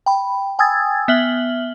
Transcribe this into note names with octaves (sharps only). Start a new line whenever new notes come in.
G5 B5
G5 G#5 D#6 E6 G#6 A6
B3 E5 F6 F#7 G7